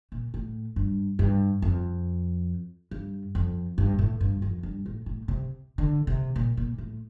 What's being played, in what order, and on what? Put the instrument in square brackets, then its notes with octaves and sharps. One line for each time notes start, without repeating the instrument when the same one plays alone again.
[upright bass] A#2
A2
G2
G2
F2
G2
F2
G2
A2
G2
F2
G2
A2
A2
C3
D3
C3
A#2
A#2
A2